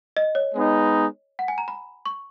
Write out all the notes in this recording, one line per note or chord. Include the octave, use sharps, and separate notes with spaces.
D#5
C#5
G#3 B3 D#4
F#5
G#5
A#5
B5
C#6